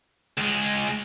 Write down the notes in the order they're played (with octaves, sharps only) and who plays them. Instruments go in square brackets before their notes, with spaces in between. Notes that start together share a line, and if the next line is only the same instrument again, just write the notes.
[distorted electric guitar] C#2 G#3